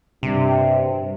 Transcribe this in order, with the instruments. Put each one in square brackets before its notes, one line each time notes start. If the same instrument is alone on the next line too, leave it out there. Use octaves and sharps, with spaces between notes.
[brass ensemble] G2 [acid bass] C3